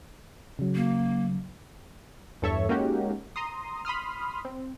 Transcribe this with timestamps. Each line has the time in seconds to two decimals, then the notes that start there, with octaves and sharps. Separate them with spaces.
0.59 C#3 F#3
0.75 A#3
2.42 E2 G2 A4 C#5 E5 C#6
2.69 G#3 A#3 C#4 D#4 F#4 G4
3.36 A#5 C6 D#6
3.85 B5 C6 D#6 F6
4.45 C4